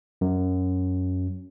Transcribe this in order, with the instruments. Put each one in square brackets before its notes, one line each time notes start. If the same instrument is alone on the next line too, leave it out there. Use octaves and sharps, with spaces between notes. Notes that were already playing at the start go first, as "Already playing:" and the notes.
[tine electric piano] F#2